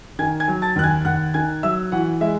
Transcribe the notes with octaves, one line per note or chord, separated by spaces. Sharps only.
D#3 G#5 G#6
G#5 G#6
F#3
A5 A6
D#2 F#6
G#5 G#6
D#2 F#5 F#6
D#3 G#5 G#6
F#3 E5 E6
E3 F#4 F#5
G#3 E5